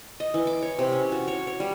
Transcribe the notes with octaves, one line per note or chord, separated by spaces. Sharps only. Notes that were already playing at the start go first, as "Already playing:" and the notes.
D#5
E3
D6
C#5
C3
C#4
F#4
C#5
C#5
G3